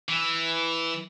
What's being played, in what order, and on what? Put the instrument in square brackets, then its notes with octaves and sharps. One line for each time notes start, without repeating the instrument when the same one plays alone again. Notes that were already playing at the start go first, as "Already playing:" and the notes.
[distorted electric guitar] E3